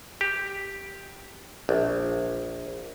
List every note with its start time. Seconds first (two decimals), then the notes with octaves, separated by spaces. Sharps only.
0.21 G4
1.69 A#1